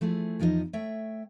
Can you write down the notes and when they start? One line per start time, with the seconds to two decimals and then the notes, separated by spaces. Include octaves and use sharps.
0.01 F3 A3 E4 G#4
0.40 E2 F3 D#4 E4 C5 D#5
0.73 A3 C#5 E5 G5